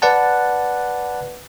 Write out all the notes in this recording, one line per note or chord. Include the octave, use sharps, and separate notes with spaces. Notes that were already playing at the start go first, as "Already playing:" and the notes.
B4 D5 F#5 A5